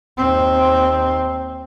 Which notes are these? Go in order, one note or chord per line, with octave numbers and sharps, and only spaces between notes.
D#2 C4